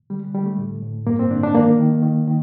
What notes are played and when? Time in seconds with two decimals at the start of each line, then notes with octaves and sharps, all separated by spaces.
0.10 D3 G3
0.34 D3 G3
0.46 A3
0.58 A2
0.83 A2
1.07 G2 A#3
1.19 C4
1.30 D3 D4
1.43 D4
1.55 D#3 A#3
1.79 D#3
2.02 D#3
2.28 D#3